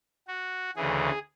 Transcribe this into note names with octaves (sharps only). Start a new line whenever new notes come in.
F#4
D2 C#3 E3 G#4